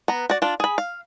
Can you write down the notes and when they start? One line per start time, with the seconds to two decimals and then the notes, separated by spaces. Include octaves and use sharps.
0.08 B3 A#5
0.30 F#4 D5
0.42 D4 F4
0.60 G#4 B5
0.78 F5